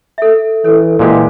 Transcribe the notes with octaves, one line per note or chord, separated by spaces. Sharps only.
A4 E5
E3 A4 C#5
A#2 E3 G#3 G4